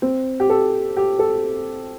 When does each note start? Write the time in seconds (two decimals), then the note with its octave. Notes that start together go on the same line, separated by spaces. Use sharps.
0.02 C4
0.40 G4
0.50 A4
0.97 G4
1.19 A4